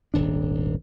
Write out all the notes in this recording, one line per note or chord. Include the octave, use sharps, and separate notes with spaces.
D#1 G#1 D4